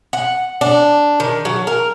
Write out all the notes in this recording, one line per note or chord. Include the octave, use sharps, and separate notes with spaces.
F#5
D4
D#3
F#3
A#4